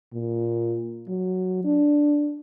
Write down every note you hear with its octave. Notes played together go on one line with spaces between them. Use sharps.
A#2
F#3
D4